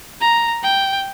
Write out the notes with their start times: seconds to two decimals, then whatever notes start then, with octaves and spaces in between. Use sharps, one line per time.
0.21 A#5
0.63 G5